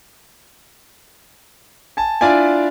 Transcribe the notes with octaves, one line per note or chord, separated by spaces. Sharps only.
G#5 A5
D4 E4 F4 D5 E5 G#5